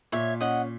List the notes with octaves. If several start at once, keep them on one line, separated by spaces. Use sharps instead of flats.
A#2 C#5 E5
C#4 D#5 F#5